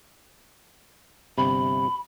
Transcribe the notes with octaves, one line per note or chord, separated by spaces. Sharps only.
G1 C3 B5